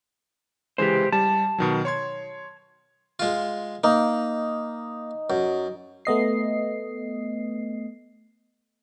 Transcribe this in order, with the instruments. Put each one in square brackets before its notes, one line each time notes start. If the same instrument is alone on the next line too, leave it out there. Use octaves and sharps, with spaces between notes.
[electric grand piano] C#3 E3 G#3 [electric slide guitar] G4 C5
[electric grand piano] G3 [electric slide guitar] A5
[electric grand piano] B2 D#3 F#3
C#5 C6 G#6
[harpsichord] G#3 F4
[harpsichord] A#3 [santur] D#4
[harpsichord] F#2
[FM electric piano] A3 B3 D#5 C7